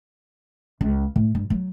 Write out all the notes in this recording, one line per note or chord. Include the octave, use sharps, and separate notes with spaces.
C#2
A2
G2
F#3